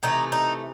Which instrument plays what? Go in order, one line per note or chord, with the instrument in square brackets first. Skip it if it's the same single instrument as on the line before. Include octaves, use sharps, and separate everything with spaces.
[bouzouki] C3 E3 A3 D#4
D#4